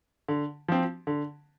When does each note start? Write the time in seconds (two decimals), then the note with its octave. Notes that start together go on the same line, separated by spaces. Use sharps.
0.28 D3
0.68 F3 C4
1.07 D3